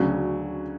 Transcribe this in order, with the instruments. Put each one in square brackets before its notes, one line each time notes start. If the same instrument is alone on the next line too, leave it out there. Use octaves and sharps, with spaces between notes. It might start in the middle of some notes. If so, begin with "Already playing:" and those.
Already playing: [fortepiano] D2 C#3 F#3